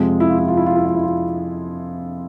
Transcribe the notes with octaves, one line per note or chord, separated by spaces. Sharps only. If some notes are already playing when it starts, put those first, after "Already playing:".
Already playing: F2 C3 F3 G#3
E4
F4
E4
F4
E4
F4
E4
F4
E4
F4